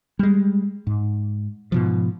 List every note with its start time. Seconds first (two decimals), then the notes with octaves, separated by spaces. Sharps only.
0.19 G3 G#3
0.87 G#2
1.72 G#2 B2 F3